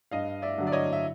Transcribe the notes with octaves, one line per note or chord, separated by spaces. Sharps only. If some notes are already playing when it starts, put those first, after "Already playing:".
G2 D#5 F5
D5 E5
D3 F#3
D5
C#5 D#5
E5